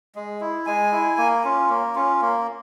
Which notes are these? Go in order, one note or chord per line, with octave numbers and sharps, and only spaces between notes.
G#3
E4
G#3 G#5
E4
A#3
C#4 F4
A#3
C#4 F4
A#3